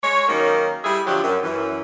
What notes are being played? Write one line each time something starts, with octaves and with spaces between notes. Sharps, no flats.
G#3 C#5
D#3 F#3 A#3 C#4 D#4
G3 E4 G#4 A4 E5
D3 F3 F#3 D4 G4
F#2
F#2 E3